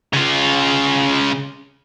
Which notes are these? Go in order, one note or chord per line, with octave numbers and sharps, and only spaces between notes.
C#3 F4